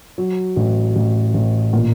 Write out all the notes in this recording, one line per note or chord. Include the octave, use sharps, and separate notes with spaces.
F#3
A1
A1
A1
A#2